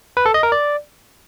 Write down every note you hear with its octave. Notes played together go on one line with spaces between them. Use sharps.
B4
A4
D#5
A#4
D5